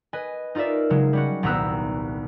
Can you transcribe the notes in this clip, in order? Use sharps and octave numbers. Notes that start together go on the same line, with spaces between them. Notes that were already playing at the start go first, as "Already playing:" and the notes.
B4 D#5 G#5
D#4 F4 A#4 D5 E5
C#3 F#3 G#3
G3 C#4 F#4
D#1 C2 B3 A#5 E6 F#6